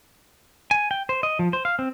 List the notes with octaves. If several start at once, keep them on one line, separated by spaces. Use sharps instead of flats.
G#5
G5
C5
D#5
F3
C5
F5
C4